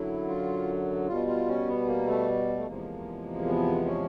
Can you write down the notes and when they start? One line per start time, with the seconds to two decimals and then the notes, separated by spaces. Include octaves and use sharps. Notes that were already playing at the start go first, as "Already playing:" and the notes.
Already playing: F#2 D3 F#3 E4
0.28 F4
1.08 B2 G3 F4
1.27 F4
1.48 C#4
1.67 B3
1.87 A#3
2.07 A3
2.58 A3
2.67 E2 C3 F3 G#3 A#3
3.47 B3
3.86 C#4